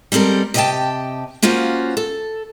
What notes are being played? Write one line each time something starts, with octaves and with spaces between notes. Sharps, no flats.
G3 G#3 C4 A4 A#4
C3 G4 D#5 E5 G5 A5
A#3 C#4 F4 F#4 C5 C#5
A4